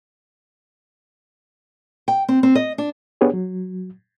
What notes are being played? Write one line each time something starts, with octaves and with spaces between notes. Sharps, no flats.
G5
C4
C4
D#5
D4
B3 D4 G4 G#4 C#5
F#3